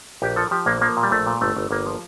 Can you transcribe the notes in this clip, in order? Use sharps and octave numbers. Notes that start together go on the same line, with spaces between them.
A#1 G4
F3 A4
F3 G4
A#1 A#3
F3 A#3
A#2
G3
A#1 A3
A#2
G1 A3
G1
G1 A#3
F3